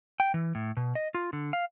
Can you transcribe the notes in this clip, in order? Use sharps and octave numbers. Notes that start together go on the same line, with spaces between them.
G5
E3
A2
B2
D#5
F4
D3
F5